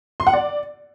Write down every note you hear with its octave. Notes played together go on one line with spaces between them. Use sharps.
C6
F#5
D5